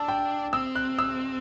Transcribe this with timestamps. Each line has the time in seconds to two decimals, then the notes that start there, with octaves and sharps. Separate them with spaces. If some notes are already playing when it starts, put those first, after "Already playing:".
Already playing: D4 A5 E6
0.08 G5
0.53 C4 E6
0.75 F#6
0.99 E6